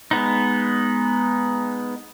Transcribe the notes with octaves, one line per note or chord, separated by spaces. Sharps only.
G#3 B3 D#4